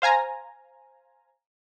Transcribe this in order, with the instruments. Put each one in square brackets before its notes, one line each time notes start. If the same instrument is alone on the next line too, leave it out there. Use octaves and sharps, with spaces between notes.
[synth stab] C5 F5 G#5 A#5